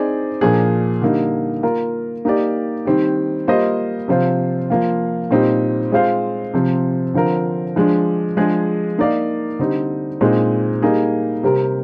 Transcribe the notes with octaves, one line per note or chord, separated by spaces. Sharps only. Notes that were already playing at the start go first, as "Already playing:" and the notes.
Already playing: C4 D#4 G#4 D5
A#2 F3 A#3 D4 G#4
D3 G3 A#3 D#4
A#3 F4 A#4
A#3 D#4 G4 D5
D#3 G3 C4 G4
G3 A#3 F4 C5 D#5
C3 F3 C4 F4 C5
F3 A#3 F4
A#2 G3 C4 D#4
G#3 C4 F4 C5 F5
C3 F3 C4
D3 F3 C4 F4 A#4
F3 G#3 D4
F3 G#3 D4 G#4
A#3 D#4 A#4 D5 F5
D3 G3 C4 D#4
A#2 G#3 C4 D#4
G3 A#3 D#4 G#4
C3 G3 C4 G4 A#4